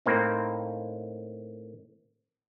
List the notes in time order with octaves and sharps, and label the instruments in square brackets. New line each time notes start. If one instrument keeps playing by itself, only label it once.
[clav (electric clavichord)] A2 A#3 C4 D#4